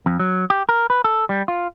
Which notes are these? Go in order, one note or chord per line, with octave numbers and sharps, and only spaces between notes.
F2
F#3
G4
A#4
B4
A4
G3
F4